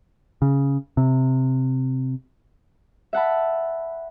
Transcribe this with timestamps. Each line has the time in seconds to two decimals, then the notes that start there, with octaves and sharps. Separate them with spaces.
0.42 C#3
0.97 C3
3.13 E5 F#5 A5 B5